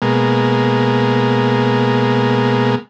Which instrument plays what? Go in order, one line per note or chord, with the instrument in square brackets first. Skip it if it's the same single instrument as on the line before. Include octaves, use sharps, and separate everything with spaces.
[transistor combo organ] B2 G#3 A#3